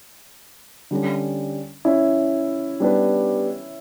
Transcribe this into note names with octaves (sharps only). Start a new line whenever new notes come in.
D3 G3 C#4
C#4 E4
G3 B3 D4 G4 B4